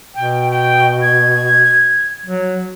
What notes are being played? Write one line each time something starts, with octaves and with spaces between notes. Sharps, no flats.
B2 G5
G5
G#6
F#3